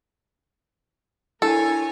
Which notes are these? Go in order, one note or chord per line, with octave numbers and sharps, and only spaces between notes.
D4 E4 A4 A#4 C#5 G#5